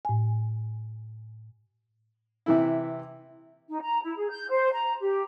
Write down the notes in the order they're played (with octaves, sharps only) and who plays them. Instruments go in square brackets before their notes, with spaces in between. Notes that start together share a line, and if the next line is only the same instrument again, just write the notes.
[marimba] A2 G#5
[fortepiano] C3 E3 E4
[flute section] D#4
A#5
E4
G#4
G6
C5
A#5
G4